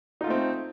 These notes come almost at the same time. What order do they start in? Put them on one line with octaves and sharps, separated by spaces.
D#4 F4 A3 C4